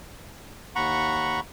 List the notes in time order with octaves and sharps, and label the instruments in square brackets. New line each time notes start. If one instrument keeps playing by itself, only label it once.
[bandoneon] D#2 F#5 A#5 B5 C#6